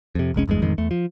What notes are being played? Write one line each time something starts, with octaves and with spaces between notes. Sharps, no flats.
F2 C3
F1 C2 G#3 C#4
G1 E2 G2 G#3
A1 F2 D#3 G#3
E2 A3
F3